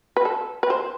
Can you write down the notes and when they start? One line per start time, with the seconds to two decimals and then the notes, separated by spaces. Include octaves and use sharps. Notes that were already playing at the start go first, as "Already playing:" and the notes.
0.16 B4
0.25 A4
0.63 B4
0.70 C5